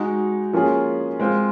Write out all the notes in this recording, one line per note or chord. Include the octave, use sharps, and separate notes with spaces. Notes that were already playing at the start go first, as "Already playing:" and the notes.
Already playing: G#3 D#4 F#4
F3 A#3 C#4 F4 G#4
G#3 C4 F4